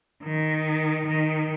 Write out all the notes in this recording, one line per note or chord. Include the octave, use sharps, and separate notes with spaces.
D#3
D#3